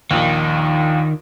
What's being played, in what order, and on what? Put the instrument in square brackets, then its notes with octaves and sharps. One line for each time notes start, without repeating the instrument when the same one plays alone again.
[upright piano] A#1 D#2 [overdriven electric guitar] D#3